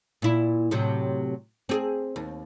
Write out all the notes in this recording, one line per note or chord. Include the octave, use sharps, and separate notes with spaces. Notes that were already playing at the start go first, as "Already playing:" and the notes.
A#2 E4
A2 C3 F#3
C4 G4 G#4
D#2